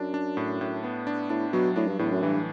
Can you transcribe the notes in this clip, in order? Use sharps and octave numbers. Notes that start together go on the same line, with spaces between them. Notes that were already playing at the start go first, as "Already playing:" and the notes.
Already playing: F#2 D4
D4
A2
A2
B3
D4
A2 D4
B2 F#3
A2 D4
G2
E2 A2
F#2
G2 E3